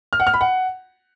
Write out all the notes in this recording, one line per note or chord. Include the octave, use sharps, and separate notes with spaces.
F6
F#5
F6
B5
F#5